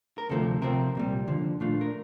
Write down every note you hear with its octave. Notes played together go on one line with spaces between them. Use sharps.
A#4
D2 C3 F3 A3 A4
C3 F3 C4 A#4
C2 A#2 G3
D#2 D3 F3
A#2 A3 D4 F4
A#4